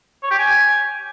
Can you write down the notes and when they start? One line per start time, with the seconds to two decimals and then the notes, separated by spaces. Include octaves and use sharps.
0.23 C#5
0.31 G4
0.38 G#5